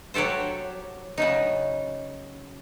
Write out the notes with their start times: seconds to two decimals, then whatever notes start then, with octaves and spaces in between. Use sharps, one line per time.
0.14 F#3 F#4 G4 A4 C5
1.18 C#3 F#3 D#4